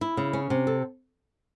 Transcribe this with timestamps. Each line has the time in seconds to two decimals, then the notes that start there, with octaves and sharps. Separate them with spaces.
0.01 E4
0.17 C#3
0.33 C#4
0.50 C3
0.67 A4